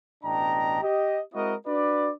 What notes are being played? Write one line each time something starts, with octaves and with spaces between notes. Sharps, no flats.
A1 B2 D4 D#5 G5 A#5
G4 D#5
G#3 C4 E4 F#4 A#4 D#5
D4 F#4 B4 D5